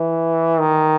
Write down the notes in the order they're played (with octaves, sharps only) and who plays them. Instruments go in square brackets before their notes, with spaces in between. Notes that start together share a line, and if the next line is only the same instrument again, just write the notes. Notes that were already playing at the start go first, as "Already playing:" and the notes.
Already playing: [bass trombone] E3
D#3